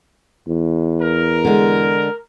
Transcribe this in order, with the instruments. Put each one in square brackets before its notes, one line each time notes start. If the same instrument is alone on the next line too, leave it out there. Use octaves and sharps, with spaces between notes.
[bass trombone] E2
[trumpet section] A#4
[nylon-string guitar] D3 G#3